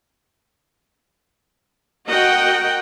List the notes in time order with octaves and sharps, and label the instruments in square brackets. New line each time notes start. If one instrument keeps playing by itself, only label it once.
[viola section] F#4 A#4 D#5 F#5 G5